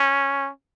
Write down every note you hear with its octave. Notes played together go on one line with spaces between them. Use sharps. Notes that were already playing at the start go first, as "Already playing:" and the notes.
Already playing: C#4